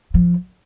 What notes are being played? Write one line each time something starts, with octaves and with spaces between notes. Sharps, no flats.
F3